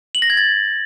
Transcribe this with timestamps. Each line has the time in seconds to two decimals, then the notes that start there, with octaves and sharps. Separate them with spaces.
0.15 F#7
0.22 A#6
0.30 G#6
0.37 A6